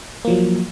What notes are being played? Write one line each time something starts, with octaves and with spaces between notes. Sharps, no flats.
F3 F#3 A#3